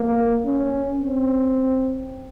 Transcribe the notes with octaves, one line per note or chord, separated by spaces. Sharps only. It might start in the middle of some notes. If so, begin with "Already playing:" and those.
Already playing: A#3
C#4
C4